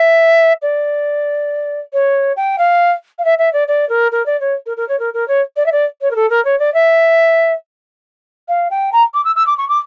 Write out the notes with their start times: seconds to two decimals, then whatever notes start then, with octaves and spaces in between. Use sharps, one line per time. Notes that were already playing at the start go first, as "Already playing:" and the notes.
Already playing: E5
0.62 D5
1.93 C#5
2.37 G5
2.59 F5
3.19 F5
3.25 E5
3.39 E5
3.53 D5
3.68 D5
3.89 A#4
4.12 A#4
4.26 D5
4.41 C#5
4.66 A#4
4.77 A#4
4.89 C#5
5.00 A#4
5.14 A#4
5.28 C#5
5.57 D5
5.66 E5
5.72 D5
6.01 C#5
6.11 A#4
6.16 A4
6.30 A#4
6.45 C#5
6.59 D5
6.74 E5
8.49 F5
8.71 G5
8.93 A#5
9.14 D6
9.25 E6
9.36 E6
9.47 D6
9.58 C#6
9.69 D6